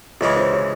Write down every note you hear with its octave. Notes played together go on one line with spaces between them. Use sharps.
C#2 C#3 E3 G#3 C#5
C5
C#5